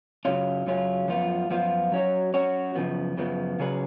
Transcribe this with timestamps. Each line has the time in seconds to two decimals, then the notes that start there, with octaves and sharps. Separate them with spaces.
0.25 F#2 C#3 F#3 C#4 F4
0.67 F#2 C#3 F#3 C#4 F4
1.08 F#2 F3 B3 F4
1.50 F#2 F3 B3 F4
1.92 F#3 C#4 F#4 C#5
2.34 F#3 C#4 F#4 C#5
2.75 F#2 C#3 F3 B3
3.18 F#2 C#3 F3 B3
3.59 C#3 F#3 C#4 G#4 B4